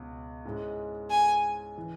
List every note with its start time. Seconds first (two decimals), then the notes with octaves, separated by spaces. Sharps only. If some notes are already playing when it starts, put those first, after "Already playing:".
Already playing: C#2 B2
0.45 G#2 G#3 C#4 E4
1.10 G#5
1.77 E3